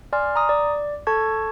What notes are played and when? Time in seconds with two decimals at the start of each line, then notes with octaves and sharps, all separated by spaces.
0.13 D5 G#5 C6 F6
0.36 A#5 D#6
0.49 D5
1.07 A4 A5 C#6 G#6